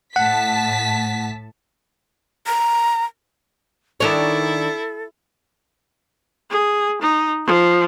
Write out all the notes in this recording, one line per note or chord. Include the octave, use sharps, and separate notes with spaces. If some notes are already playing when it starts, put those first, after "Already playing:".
A2 F#5 A5 B6
A#5
D#3 D4 E4 A4 C#5
G#4
D#4
F3